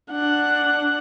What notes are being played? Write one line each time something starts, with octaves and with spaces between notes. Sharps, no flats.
D4 F#5